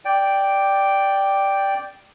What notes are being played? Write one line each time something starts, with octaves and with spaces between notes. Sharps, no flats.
D5 G5